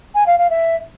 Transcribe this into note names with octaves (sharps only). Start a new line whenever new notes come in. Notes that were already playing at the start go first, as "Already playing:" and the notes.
G#5
F5
F5
E5